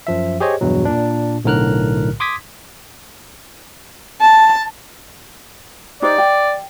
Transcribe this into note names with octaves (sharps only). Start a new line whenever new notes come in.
F#2 F3 E5
G4 G#4 C5 C#5 D#5
E2 G2 B2 F#3
A#2 D4
B1 A2 D3 A#4 F6 F#6
C6 D6 D#6 G#6 B6
A5
D#4 G4 C5 D5
G5